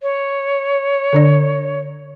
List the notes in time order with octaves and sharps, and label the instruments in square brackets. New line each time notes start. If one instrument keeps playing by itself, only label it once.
[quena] C#5
[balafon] D3 D4 D5